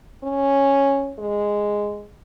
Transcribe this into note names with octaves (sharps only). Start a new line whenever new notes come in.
C#4
G#3